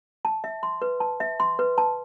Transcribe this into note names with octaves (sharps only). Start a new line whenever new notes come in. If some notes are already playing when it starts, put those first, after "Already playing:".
A5
E5
C6
B4
A5
E5
C6
B4
A5